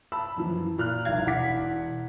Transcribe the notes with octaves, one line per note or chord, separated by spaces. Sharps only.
A5 B5 E6
F#2 E3 F3
A#2 F6 F#6
F1 C2 E4 F5 G#6
E1 E4 F#5 D6 B6